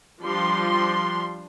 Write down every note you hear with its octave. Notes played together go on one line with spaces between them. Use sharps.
F3 G3 D4 C6